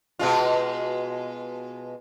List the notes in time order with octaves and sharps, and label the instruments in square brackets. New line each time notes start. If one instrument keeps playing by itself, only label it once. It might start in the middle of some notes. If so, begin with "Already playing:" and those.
[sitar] B2 G#3 F4